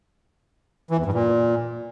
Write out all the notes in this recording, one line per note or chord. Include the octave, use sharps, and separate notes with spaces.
E3
E2
G2
A#2